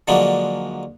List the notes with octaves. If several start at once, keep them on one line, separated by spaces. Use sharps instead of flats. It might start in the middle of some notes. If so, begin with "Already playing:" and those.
D3 F3 F#3 G#3 A#3 D4